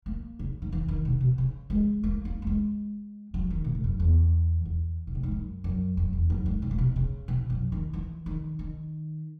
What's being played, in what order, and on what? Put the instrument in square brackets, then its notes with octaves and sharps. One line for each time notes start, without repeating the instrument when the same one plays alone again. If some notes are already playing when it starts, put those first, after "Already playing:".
[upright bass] A#3
C#3
D#3
E3
D#3
B2
B2
C#3
G#3
A#3
A#3
A#3
G#3
F#3
D#3
A#2
G#2
F#2
E2
E2
B2
A#2
G#2
F#2
F#2
F#2
E2
F#2
G#2
B2
A#2
B2
C#3
B2
F#2
D#3
E3
D#3
D#3